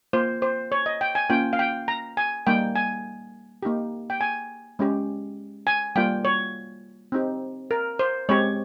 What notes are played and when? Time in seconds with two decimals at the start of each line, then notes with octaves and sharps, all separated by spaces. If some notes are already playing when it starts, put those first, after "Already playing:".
0.13 A#3 F4 C5
0.42 C5
0.72 C#5
0.86 D#5
1.01 G5
1.15 G#5
1.30 A#3 C#4 F4 G5
1.53 F5
1.59 G5
1.88 A#5
2.17 G#5
2.47 G3 A#3 D#4 G5
2.75 G#5
3.63 A#3 D#4 G4
4.10 G5
4.21 G#5
4.79 G#3 C#4 G4
5.67 G#5
5.96 G3 A#3 F4 G5
6.25 C#5
7.12 C4 D#4 G4
7.71 A#4
7.99 C5
8.29 G#3 C4 G4 C#5